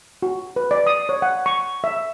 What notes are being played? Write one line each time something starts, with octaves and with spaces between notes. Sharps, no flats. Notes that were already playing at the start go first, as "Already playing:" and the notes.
F#4
B4
D5
D#6
C#5
F#5
C#6
E5